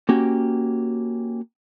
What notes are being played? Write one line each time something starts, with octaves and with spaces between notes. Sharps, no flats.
A#3 C#4 F#4 G4